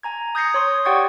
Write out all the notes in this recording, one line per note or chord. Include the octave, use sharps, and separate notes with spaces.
G#5 A#5 G#6
D#6 G6 G#6 A#6 C7 C#7
C#5 C6 D#6
G4 D5 F#5 G5 C#6 G#6